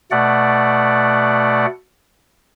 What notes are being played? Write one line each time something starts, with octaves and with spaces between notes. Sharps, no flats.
B2 A3 D5 F#5